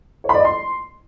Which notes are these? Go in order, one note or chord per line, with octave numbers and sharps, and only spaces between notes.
C#5
B5
D5
D#5
C6